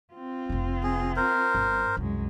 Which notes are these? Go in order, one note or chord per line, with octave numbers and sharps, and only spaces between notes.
C4 F4
F1 C3
G#4
A#4 C5
G1
C2 F#2 G#3